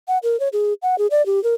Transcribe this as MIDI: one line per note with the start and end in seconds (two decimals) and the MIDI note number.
0.08 0.18 78
0.23 0.39 70
0.40 0.48 73
0.53 0.73 68
0.83 0.98 78
0.98 1.07 68
1.11 1.25 74
1.26 1.42 67
1.44 1.54 70